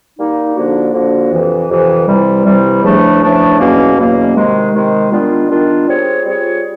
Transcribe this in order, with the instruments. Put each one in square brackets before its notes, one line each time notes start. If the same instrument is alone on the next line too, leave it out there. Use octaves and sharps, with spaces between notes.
[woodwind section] G3 A#3 D#4
D3 F3 A#3 D4 F#4
D3 F3 A#3 D4 F#4
F2 C3 E3
F2 C3 E3
C3 E3 G3
C3 E3 G3
E2 C#3 F3 A3 D4
E2 C#3 F3 A3 D4
E2 B2 F#3 A#3 C#4
E2 B2 F#3 A#3 C#4
C3 D#3 G#3
C3 D#3 G#3
D#3 G3 B3 D4 F4
D#3 G3 B3 D4 F4
G3 C4 F4 G#4 C#5
G3 C4 F4 G#4 C#5